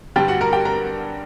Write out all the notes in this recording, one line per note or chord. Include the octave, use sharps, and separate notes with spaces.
G2 D3 G3 G4 G5
F#4 F#5
A#4 A#5
G4 G5
A#4 A#5